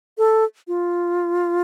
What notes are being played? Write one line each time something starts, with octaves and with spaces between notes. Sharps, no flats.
A4
F4